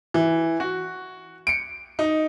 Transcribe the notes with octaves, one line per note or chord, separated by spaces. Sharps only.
E3
F#4
C#7 D7
D#4